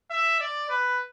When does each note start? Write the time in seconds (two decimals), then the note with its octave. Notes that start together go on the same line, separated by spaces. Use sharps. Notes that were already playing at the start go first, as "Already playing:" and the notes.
0.10 E5
0.40 D5
0.69 B4